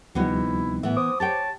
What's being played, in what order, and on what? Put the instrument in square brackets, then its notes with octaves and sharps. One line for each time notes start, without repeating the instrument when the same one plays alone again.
[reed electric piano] D2 F3 G3 [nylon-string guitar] C3 B3 D#4 [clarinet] E4
[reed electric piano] A2 E5 [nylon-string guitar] E3 B3
[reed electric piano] C5 D6 [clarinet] D#6
[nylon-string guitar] G4 C#5 G5 [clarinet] A5